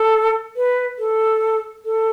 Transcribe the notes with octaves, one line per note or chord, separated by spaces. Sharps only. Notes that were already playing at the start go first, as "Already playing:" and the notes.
Already playing: A4
B4
A4
A4